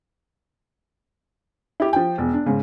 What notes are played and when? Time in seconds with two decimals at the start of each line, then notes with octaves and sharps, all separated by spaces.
1.80 E4 G4
1.93 F3 G5
2.18 E1
2.33 D4
2.46 G#2 C#3